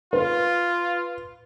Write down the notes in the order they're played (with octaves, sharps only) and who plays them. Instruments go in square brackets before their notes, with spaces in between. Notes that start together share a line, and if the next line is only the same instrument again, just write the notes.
[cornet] F4 [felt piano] B4